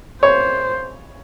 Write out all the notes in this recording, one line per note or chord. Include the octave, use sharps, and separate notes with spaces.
C5 C#5